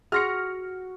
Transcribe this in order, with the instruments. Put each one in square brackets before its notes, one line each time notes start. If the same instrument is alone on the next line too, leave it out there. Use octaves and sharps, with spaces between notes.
[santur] F#4 [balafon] G#4 C6 [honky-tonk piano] F6 A#6 C#7